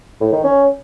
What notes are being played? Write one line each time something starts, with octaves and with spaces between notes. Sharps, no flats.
A2
D#3
C#4